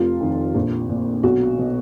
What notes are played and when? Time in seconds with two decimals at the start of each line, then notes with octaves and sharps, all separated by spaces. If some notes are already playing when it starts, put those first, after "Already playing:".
Already playing: F1 F4
0.20 F2 D#3
0.55 A#1
0.89 A#2
1.23 B1 F#4
1.58 B2